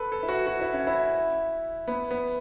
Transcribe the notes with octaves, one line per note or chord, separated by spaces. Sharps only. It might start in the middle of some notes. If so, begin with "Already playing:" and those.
Already playing: A4 B4
A4
E4
F#4
F#4
E4
C#4
E4
B3
B3